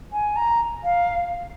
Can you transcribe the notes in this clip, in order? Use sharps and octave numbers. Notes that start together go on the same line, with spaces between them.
G#5
A#5
F5